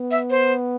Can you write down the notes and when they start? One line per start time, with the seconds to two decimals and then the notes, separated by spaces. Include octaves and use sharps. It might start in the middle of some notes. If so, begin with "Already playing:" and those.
Already playing: B3
0.11 E5
0.30 C5